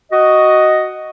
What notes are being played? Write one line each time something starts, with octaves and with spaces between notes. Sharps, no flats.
F#4 D#5